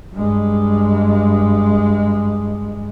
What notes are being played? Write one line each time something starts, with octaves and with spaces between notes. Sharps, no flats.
G2 G#3